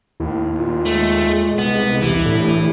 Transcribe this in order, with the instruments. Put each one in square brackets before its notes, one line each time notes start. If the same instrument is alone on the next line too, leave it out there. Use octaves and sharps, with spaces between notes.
[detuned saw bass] D#2 [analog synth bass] A2
[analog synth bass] A#2
[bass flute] G#3 [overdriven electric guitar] A3
[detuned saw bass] C2 [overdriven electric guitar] B3
[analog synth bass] E1 [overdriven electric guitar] E3 [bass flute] G4
[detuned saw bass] A2 [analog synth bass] D3